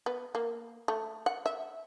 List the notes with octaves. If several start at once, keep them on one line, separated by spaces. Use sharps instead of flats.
B3
A#3
A3
F#5
E5